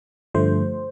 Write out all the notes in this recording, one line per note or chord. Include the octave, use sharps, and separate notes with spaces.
G2 D3 F3 A3 C5